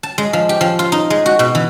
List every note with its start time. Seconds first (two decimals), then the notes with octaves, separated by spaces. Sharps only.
0.03 A5
0.18 G#3
0.33 F3
0.49 G4
0.61 F3
0.79 F4
0.92 D#4
1.10 G#3
1.26 F#4
1.39 B2
1.55 E3